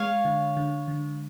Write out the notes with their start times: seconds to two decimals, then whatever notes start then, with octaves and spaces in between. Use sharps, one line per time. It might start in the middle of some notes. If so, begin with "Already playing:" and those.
Already playing: G#3 C#5 F5
0.25 D3
0.57 D3
0.88 D3